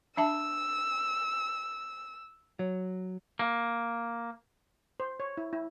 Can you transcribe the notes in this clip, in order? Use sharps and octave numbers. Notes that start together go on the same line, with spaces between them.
D4 E5 A5 E6
F#3
A#3
C5
C#5
E4
E4